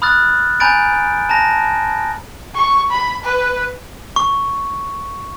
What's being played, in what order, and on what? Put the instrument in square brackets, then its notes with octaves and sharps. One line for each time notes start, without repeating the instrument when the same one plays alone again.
[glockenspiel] B5 D#6 F6 F#6 A6
G#5 A#5 B5 G6 A6 D7
A5 A#5 A#6
[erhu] C#6
B5
B4
[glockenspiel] C#6